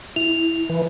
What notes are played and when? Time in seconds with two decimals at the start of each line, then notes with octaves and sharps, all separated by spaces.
0.16 E4 F7
0.70 E3